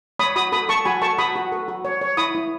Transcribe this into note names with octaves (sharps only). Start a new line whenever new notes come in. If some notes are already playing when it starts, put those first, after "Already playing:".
C#5 B5 D#6
F#4 B5 D#6
A4 B5 D#6
A4 A5 C#6
F#4 G#5 B5
A4 A5 C#6
F#4 B5 D#6
F#4
A4
F#4
C#5
C#5
E4 B5 D#6
E4